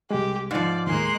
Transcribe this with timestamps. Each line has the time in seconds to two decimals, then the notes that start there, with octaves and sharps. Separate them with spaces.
0.11 C2 G#3 G4
0.51 G#2 F3 D5
0.87 D#2 A2 G#3 A#3 G#5 C6 F#6